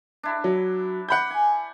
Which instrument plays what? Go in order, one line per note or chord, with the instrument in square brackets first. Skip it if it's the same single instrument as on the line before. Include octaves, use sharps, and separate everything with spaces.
[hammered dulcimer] D4 E4
[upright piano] F#3
F#5 B5 G6
[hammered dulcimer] G#5